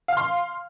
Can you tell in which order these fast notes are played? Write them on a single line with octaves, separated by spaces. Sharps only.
F5 F6 C6